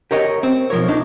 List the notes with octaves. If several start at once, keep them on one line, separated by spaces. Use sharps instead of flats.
G4 A#4 C#5 D#5 F#5 G5
C4
B1 F3 A#4 C#5
D4 D#4